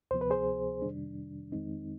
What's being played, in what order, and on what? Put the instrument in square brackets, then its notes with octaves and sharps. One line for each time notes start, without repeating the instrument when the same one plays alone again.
[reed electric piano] D2 C3 F3 B3 C5
B4
G#4 C5
F2 C3 D#3 G3 D4
F2 D#3 G#3 C4 D#4